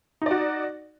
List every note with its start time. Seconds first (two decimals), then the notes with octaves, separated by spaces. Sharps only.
0.22 D#4
0.26 D5
0.31 F#4